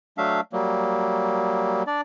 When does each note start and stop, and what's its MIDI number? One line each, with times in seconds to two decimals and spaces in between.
0.18 0.41 54
0.18 0.41 57
0.18 0.41 62
0.18 0.41 76
0.18 0.41 77
0.53 1.83 54
0.53 1.83 55
0.53 1.83 58
1.87 2.01 62
1.87 2.01 74